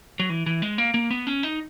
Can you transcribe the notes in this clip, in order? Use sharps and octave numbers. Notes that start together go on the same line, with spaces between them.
F#3
E3
E3
G#3
A#3
A#3
B3
C#4
D#4